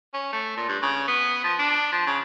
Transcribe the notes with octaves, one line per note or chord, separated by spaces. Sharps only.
C#4
A3
A#2
G2
C#3
B3
F3
D4
F3
C#3